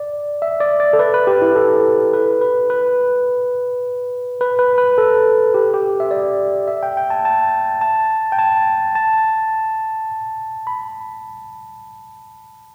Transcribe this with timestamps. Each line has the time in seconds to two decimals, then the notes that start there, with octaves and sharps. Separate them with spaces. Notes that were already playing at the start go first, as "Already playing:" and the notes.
Already playing: D5
0.42 E5
0.60 D5
0.80 D5
0.93 A4
0.99 B4
1.14 B4
1.27 G4
1.42 E4
1.55 A4
2.13 B4
2.41 B4
2.70 B4
4.41 B4
4.59 B4
4.78 B4
4.98 A4
5.54 G4
5.74 G4
6.00 E5
6.11 D5
6.68 E5
6.83 G5
6.97 G5
7.10 A5
7.25 A5
7.81 A5
8.32 G5
8.39 A5
8.95 A5
10.67 B5